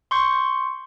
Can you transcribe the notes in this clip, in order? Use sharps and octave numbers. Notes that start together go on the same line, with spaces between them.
C6 C#6 G6